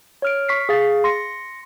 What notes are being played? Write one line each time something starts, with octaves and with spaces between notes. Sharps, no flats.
C#5 F6 D7
C#6 B6 C7
G#4 F5 A6
C6 A#6 C#7